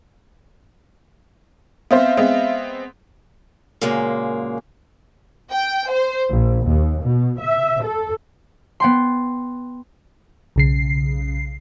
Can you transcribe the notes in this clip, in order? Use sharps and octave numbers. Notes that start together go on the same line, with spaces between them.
B3 C4 C5 E5 F5
G#3 B3 C4
F#2 A#2 C#3 G#3 A#3
G5
C5
A#1
D#2
B2
E5
A4
B3 G5 C6
B1 C#3 C7